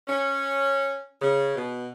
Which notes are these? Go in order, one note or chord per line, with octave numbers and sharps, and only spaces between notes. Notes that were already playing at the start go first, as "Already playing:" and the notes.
C#4
C#3
B2